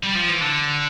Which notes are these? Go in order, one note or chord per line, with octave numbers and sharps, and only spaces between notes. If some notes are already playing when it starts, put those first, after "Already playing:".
G3
F3
E3
D3